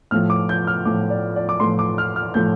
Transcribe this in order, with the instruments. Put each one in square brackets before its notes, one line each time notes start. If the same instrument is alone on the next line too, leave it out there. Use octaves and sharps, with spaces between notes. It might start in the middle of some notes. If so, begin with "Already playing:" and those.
[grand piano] A2 F3 A3 F6
D6
G6
F6
A2 F3 A3 D6
D5
D5
D6
A2 F3 A3 C6
D6
F6
F6
A2 F3 A3 G6